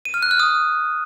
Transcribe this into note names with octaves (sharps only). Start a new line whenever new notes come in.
D#7
F6
F#6
F6
D#6